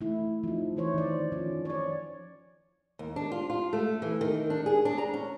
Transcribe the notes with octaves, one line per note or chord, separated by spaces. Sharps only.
A3 E4
F3 D#4
E3 E4 C5 C#5
D#3 D5
F3 C#4
C#5 D5
D#2
D4
F4
F4
A3
E3
D#3
D4
G#4
D4
A#5
C#4